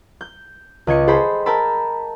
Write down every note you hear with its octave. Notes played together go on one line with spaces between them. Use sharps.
G6
C#2 D#5 G#6 C#7
G#4 A4 C5 G5 B5 G6
A#4 G5 A5 B5 E6